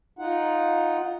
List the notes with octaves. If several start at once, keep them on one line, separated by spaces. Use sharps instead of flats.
D#4 F4 F#5